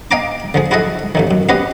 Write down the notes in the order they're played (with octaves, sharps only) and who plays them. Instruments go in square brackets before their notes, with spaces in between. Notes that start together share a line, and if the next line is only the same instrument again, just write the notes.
[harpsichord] D#5 F5 G5 G#5 A#5 D6
D3 F3 G#4
E4 F#4 G#4 A4 D#5 E5
A1 A2 D#3
F#2
B3 C#4 F#4 G4 B4 D#5